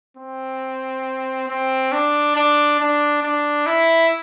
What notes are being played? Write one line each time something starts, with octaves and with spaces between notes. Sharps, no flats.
C4
C4
D4
D4
D4
D4
E4